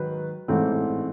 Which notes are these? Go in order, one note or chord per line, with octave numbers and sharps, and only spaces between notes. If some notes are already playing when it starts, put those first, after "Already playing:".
Already playing: G#2 D#3 F#3 B4
A1 G#2 E3 A3 C4